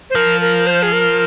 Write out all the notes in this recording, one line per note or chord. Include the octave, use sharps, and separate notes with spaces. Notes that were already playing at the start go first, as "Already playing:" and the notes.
C5
F3 A#4
A#4
C5
G#4
A#4